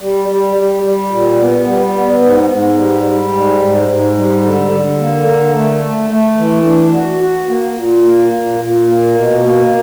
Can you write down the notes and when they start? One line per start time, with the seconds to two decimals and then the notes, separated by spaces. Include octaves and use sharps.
0.01 G3
0.29 G3
0.56 G3
0.83 G3
1.11 A#2
1.40 B3
1.67 G3
1.95 B3
2.22 G#2
2.50 G#2
2.77 G3
3.05 G3
3.33 G#2
3.61 G#2
3.88 G#2
4.16 G3
4.44 D3
4.72 D3
4.99 A#3
5.27 D3
5.54 A3
5.83 A3
6.10 A3
6.37 E3
6.65 D4
6.93 F#4
7.21 F#4
7.48 A#3
7.76 A#2
8.04 A#3
8.32 A#2
8.59 A#2
8.87 A#3
9.15 B2
9.42 A#3